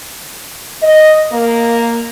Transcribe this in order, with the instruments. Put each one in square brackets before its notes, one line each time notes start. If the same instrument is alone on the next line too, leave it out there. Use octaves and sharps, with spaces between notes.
[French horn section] D#5
A#3